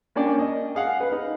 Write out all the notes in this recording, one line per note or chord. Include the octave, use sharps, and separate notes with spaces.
A#3 C#4 D4 D5 G5
D#5
G#4 F5 F#5
B4
D#4